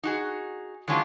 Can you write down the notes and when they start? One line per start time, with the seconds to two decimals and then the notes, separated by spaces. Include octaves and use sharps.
0.03 D#4 F#4 G#4
0.88 D#3 F#3 G#3 C#4 D4 F4